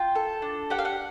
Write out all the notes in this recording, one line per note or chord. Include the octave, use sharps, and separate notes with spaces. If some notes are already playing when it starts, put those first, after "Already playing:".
Already playing: F4 G5
A4
D4
G4 F#5
F5
F#5